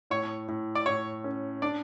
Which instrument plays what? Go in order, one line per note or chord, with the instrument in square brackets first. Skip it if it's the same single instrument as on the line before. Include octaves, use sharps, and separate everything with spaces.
[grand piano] A2 [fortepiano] C#5
[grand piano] A2
[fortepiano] D5
[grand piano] A2 [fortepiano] C#5
[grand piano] C#4
[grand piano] D4 [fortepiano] D5